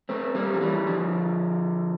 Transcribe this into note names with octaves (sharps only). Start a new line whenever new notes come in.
A3 C4
G3 A#3
F3
E3 G3
D3 F3